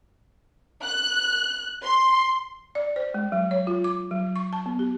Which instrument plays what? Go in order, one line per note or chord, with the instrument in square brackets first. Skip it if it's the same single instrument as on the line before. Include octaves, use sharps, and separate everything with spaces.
[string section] F#6
C6
[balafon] D5
C5
G#3
F#3
C#5
F4
D6
F#3
C#6
A5
B3
G4